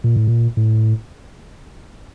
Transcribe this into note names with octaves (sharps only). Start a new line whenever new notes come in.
A#2
A2
A#2
A2